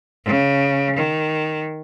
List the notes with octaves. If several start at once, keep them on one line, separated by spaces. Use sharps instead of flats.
C#3
D#3